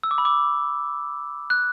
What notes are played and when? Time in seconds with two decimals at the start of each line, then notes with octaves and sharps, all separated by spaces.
0.03 E6
0.11 D6
0.18 B5
0.25 D6
1.50 F#6